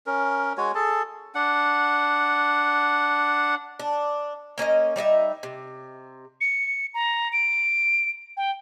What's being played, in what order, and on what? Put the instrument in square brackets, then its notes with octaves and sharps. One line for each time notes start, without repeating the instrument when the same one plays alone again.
[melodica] C#4 A#4
G#3 F#4 C#5 G#5
G#4 A4 A5
D4 F#5
[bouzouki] D4
A#3 C#4 D5 D#5
G3 D4 D#4 E5
C3
[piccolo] C#7
A#5
D7
G5